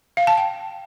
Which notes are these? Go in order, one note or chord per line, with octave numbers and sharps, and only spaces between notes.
F5
A5
G5